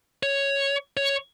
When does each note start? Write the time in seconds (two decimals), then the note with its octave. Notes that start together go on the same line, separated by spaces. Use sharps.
0.23 C#5
0.97 C#5